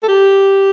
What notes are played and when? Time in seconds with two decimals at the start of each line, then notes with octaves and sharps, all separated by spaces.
0.03 A4
0.08 G4